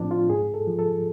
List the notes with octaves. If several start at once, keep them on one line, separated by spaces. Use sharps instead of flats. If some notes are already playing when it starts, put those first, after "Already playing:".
Already playing: A2 F3 C4 D4
F4
G#2 G#4
A4
F3
A4